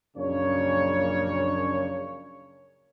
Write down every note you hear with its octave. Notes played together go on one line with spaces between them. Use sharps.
A#1 F#2 C#3 A#3 D4 C#5